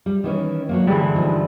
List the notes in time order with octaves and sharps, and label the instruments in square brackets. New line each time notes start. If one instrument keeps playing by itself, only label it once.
[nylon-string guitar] G3
D#3 E3 C#4
F#3 A3 A#3
[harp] G2 D3 E3 [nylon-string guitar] G#3
[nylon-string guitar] D#3 F3